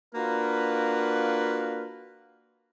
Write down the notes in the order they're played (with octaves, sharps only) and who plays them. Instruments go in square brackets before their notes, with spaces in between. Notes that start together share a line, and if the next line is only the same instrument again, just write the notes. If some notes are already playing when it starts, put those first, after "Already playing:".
[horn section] A#3 D4 F4 F#4 A#4 B4